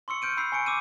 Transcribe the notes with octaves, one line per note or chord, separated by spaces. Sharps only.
C6 C#6 E6 C#7
F6 G6 D7 D#7
B5 E6 G6 C7
G#5 C#6 C#7 D7
D6 E6 D#7